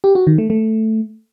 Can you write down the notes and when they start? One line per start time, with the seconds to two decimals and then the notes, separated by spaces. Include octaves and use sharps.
0.04 G4
0.15 F#4
0.27 D#3
0.38 A3
0.50 A3